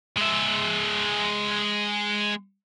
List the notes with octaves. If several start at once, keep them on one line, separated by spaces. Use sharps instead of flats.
G#3 E5